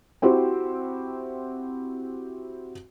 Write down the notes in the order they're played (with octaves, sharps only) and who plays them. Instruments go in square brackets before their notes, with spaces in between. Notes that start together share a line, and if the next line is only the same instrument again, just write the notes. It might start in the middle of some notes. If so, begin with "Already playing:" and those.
[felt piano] C4 E4 F#4 G4 C5